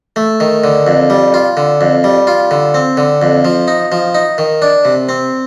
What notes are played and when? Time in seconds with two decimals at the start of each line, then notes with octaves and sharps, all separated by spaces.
0.16 A3
0.40 D#3
0.64 D3
0.87 F2
1.10 G3
1.34 F4
1.57 D3
1.81 F2
2.04 G3
2.27 F4
2.51 D3
2.74 C4
2.97 D3
3.22 F2
3.45 F3
3.68 D#4
3.92 F3
4.14 D#4
4.38 D#3
4.62 D4
4.85 C3
5.09 C4